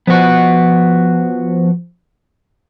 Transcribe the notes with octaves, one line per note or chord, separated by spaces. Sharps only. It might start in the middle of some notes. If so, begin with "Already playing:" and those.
F3 B3 F#4